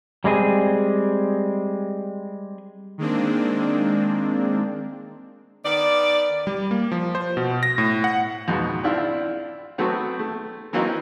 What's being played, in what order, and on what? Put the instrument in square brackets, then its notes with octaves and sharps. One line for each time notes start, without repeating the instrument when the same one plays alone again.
[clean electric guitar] G3 G#3 C4 G#4
[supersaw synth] D#3 G#3 A#3 C4 D4
[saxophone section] D#3 B3 D5
[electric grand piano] G3
A#3
F3
C5
B2
A#6
A2
F#5
[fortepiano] F2 G#2 B2
C4 D4 E4 F4
F#3 A3 B3 C4 F#4
A3
E3 F#3 A#3 C4 C#4 D#4